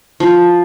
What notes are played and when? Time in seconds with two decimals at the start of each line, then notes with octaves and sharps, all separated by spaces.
0.20 F3